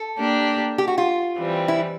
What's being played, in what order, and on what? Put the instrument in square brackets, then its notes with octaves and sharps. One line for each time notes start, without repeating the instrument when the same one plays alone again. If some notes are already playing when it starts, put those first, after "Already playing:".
Already playing: [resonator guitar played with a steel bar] A4
[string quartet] A#3 D4 G4
[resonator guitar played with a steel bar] G4
F#4
F4
[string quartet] E3 G3 C4
[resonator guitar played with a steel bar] E4